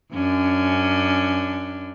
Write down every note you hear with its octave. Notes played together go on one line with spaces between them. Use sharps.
F#2 C#4 D4